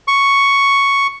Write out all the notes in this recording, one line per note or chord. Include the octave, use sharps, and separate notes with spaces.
C#6